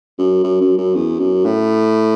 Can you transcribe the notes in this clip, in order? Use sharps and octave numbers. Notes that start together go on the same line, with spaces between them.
F#2
F#2
F#2
F#2
E2
F#2
A2